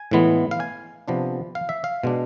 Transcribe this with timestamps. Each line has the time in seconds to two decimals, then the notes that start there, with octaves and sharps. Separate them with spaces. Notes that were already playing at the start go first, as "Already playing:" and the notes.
Already playing: G#5
0.11 A2 E3 G#3 B3
0.51 F5
0.60 G#5
1.08 C3 F3 B3 D4
1.55 F5
1.69 E5
1.84 F5
2.03 B2 G#3 D4